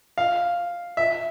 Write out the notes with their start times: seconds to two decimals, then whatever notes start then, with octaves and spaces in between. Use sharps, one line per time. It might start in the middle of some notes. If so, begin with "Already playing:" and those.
0.18 F5
0.97 E5